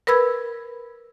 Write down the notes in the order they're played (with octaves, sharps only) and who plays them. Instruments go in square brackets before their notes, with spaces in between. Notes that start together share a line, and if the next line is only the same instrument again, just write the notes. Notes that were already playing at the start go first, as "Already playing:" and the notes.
[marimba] A#4 B4 B5 E6 G#6